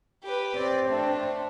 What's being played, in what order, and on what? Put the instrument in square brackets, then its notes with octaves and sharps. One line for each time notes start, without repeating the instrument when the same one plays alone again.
[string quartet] G4 B4
[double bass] C4 [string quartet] D5
[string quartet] A3 D4